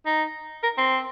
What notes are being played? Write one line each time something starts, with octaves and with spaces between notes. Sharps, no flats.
D#4
A#4
C4